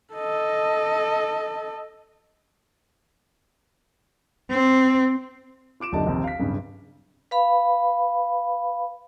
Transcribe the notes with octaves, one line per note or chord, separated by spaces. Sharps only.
A4 D#5
C4
F4 D6 D7 E7
F#1 B1 D3 G4 D#5 A5
A#1 D#2 C3
F5 B6
D1 G2 C#3
B4 F5 B5